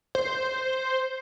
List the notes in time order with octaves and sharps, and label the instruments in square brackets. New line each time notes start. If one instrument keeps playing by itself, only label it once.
[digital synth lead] C5